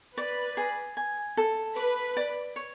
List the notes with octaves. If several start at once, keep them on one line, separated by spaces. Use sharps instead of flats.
B4 D5
G#4
G#5
A4
B4 D6
D5
C#5